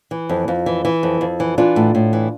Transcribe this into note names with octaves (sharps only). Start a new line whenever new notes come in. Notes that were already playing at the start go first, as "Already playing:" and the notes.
E3
F2
F2
E3
E3
F2
F2
E3
E3 D4 F4
A2
A2
E3